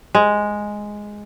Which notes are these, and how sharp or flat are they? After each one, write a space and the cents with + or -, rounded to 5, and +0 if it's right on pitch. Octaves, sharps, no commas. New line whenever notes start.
G#3 +0